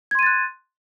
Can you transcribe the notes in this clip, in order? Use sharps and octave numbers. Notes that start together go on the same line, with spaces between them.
C6 F#6 G#6 A6 D#7